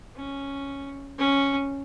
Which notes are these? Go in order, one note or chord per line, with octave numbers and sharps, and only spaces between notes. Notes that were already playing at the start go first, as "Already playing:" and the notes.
C#4
C#4